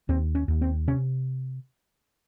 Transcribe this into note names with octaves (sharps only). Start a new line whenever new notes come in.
D#2 C4
C#4
D#2
C4
C3 C#4